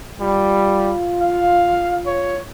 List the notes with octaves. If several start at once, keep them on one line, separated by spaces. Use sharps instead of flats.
G3 F4
F5
C#5